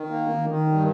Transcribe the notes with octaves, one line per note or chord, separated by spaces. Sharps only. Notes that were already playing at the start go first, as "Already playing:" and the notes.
Already playing: D#3
A#3
D#3
D#3
G2